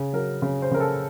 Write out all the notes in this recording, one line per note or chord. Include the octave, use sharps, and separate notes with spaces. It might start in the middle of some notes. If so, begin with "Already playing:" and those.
Already playing: C#3
F#3 A#4
C#3
C5
C#3 A#4
A4